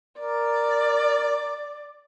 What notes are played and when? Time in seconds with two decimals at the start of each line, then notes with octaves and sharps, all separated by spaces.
0.19 A#4 D5